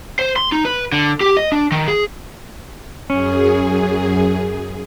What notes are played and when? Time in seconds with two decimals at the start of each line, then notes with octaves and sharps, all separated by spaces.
0.19 C5
0.36 C6
0.52 D#4
0.65 B4
0.92 D3
1.21 G4
1.37 D#5
1.52 D4
1.72 D#3
1.88 G#4
3.10 F#2 C#4 G#4